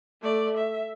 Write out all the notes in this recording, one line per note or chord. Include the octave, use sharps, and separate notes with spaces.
A3 D5
E5